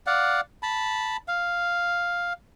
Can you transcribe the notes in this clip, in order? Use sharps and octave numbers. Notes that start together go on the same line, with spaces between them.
D5 F5 F#5
A5 B5
F5